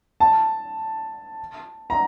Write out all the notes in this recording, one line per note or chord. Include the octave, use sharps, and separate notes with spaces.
A5
A#5